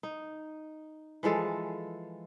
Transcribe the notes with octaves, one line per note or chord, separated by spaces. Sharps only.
D#4
E3 F3 G#3 A4